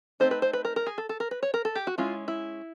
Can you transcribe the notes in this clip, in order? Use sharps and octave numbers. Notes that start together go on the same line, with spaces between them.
A3 C4 D#4 C5
B4
C5
B4
A#4
A#4
G#4
A4
A4
A#4
B4
C#5
A#4
A4
G4
F#4
G#3 C#4 E4 F4
E4